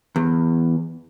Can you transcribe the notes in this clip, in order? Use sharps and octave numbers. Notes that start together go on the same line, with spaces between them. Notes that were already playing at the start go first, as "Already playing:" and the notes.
E2